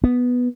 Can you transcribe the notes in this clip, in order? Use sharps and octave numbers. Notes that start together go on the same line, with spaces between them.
B3